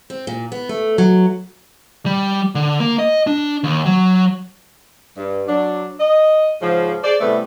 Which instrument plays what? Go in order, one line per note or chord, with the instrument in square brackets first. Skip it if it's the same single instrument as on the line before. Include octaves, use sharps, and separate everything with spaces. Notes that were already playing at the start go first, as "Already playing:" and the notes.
[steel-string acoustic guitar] C4
A#2
B3
A3
F#3
[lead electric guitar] G3
D3
A#3
D#5
D4
D#2
F#3
[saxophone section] G2
F#3 D4
D#5
G#2 C#3 F3
G#4 C5 D5
A2 C3 G3 A3 B3